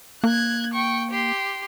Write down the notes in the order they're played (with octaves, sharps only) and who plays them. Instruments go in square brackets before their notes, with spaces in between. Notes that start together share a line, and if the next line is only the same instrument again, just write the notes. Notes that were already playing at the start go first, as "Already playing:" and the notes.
[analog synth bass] A#3 [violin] F#6 G#6
[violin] G5 C#6
G4 C6